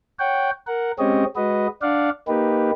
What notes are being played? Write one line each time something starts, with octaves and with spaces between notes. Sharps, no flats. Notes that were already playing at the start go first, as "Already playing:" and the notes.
C#5 F#5 G5
A#4 F#5
G#3 C4 C#4 G4 C#5 D#5
G#3 F#4 B4 D#5
D4 D5 F5 F#5
A#3 D#4 G4 B4